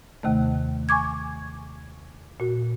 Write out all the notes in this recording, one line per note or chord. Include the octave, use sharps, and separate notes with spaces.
D#2 C3 D#3 A3
G#5 C#6 D6 G#6
A#2 F#4